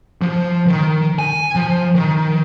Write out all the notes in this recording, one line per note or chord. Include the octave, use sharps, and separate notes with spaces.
F3
D#3
G#5
F3
D#3